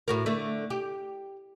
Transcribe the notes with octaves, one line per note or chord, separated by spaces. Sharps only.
A2 F#4 A#4
D3 A3
G4